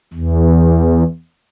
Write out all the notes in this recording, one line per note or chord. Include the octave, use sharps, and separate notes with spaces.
E2